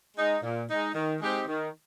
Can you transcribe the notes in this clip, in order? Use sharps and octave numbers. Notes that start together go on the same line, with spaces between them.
G#3 D#4
A#2
G#3 D#4
D#3
G#3 C4 D#4 G4
D#3